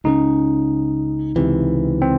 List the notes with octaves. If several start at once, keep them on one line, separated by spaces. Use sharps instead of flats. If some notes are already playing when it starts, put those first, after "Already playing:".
C#2 C#3 G#3 C#4 D#4
C#2 C3 E3
C4